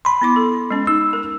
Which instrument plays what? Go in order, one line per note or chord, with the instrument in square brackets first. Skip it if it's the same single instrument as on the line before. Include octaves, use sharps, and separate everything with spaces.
[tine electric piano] B5 C6
[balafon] B3 E4 D6
A4
G#3 C#4
[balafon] D#4 [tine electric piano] E6
[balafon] A#4